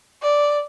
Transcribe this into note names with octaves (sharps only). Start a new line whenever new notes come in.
D5